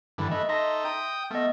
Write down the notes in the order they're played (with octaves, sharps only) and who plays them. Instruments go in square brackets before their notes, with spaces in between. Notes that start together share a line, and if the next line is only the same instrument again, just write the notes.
[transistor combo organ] G2 D3 E3
[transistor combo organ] A3 B4 [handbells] D#5
[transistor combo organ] D#4 A4 [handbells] E5 C6 A#6
[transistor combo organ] G5 D#6
[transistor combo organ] A3 [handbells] B3 D#5